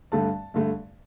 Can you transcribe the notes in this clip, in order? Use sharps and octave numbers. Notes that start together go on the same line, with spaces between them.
G2 D3 A3 A5
G2 D3 A3